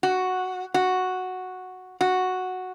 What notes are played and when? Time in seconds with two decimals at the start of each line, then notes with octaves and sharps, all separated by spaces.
0.03 F#4
0.74 F#4
2.01 F#4